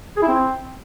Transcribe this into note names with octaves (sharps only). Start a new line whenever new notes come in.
G#4
E4
C4